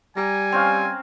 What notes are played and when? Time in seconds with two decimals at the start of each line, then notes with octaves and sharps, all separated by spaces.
0.17 G3 G#5 A#5
0.52 C4 C#4 F5